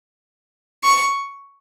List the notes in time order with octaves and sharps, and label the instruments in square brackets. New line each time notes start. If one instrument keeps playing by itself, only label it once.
[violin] C#6